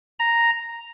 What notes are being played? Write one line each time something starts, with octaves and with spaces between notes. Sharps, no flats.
A#5